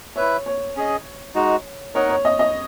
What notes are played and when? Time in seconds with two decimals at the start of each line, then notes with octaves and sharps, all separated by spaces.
0.16 E4 B4 C#5 E5
0.46 C#5
0.76 C#4 G#4 D#5
1.35 G#3 D#4 F#4
1.95 D#4 A#4 C#5 D#5 F#5
2.09 C#5
2.25 D#5
2.39 D#5